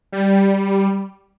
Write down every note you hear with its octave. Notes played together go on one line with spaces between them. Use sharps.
G3